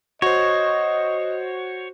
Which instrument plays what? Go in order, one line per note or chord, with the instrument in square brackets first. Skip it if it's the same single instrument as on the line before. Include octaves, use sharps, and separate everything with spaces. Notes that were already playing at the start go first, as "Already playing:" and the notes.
[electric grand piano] F#4 C5 [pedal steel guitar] C#5 [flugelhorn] D#5